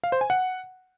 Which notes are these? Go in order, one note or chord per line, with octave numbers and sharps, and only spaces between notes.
F5
C5
G#5
F#5